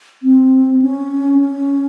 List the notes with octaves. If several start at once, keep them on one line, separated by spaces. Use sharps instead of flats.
C4
C#4
C#4